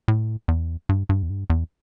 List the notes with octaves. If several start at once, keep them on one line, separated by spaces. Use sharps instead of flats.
A2
E2
G2
G2
E2
G2
E2